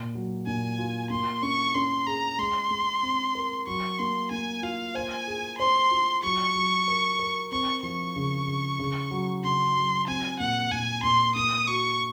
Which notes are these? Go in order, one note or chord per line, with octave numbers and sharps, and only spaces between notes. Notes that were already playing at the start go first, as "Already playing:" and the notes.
Already playing: A#2
F#3
A#2 G#5
F4
A#3 C6
C#4 C#6
C#4 C6
G#4 A#5
G#3 C6
G#3
C4
A#4
F#3 C#6
A#3 C6
A#3 G#5
F4 F5
C5 G#5
G#4
C5 C6
F4
F#3 C#6
F#3
A#4
A#4
C4 C#6
F3 C#6
C#3
C#3
C#3
F#3
C#3 C6
F#3
C4 G#5
A#2 F#5
A#2 G#5
A#2 C6
A#3 D#6
F#4 C#6